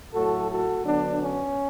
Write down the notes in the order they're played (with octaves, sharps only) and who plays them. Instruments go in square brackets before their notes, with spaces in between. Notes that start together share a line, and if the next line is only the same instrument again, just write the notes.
[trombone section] A2 F#3 A3 F#4 A4
F#4 A4
D3 F#3 B3 D4
C#4